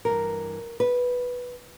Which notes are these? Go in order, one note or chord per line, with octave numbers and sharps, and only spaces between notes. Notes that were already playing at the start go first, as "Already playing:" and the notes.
G2 E3 A#4
B4